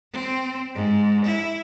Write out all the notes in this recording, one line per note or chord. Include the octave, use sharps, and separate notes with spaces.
C4
G#2
E4